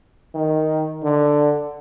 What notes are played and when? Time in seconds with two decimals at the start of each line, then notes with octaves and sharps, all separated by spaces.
0.35 D#3
1.03 D3